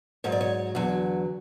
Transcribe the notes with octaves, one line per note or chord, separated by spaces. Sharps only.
G#2 F#3 C#5
D5
C#5
E2 D3 F#3